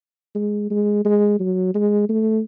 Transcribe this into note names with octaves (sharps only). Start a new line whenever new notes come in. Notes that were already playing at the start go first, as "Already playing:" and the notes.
G#3
G#3
G#3
F#3
G#3
A3